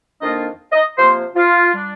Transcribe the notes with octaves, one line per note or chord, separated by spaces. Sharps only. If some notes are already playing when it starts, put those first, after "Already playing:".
F2 D#3 A#3 D4 F4 D#5
D#5
C3 F3 A#3 C5
F4
G3 D4